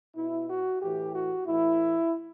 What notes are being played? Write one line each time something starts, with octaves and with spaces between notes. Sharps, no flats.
B2 E4
F#4
A2 E3 G4
F#4
A2 E3 E4